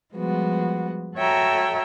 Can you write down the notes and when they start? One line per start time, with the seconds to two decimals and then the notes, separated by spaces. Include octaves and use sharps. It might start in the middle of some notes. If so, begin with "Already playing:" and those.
0.13 F3 G3 G#3 B3 F#4
1.15 F#4 A4 C#5 E5 G5 A#5